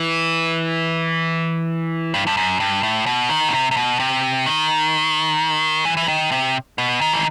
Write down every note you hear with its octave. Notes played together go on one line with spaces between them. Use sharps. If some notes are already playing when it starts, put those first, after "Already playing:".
Already playing: E3
G2
G2
F#2
G2
A2
B2
D#3
B2
C3
C3
B2
C3
D#3
E3
E3
D#3
C3
B2
D#3
E3